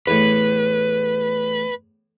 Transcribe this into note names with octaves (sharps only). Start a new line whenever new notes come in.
E2 A2 B4